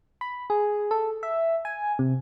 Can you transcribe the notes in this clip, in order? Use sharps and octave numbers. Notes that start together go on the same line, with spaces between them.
B5
G#4
A4
E5
G#5
C3